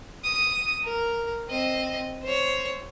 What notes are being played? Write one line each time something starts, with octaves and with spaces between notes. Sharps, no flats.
D#6
A#4
C4 D#5
C5 C#5